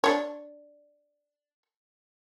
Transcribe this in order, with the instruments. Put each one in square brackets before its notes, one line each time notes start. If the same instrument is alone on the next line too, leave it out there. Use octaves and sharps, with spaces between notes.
[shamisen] D4 C#5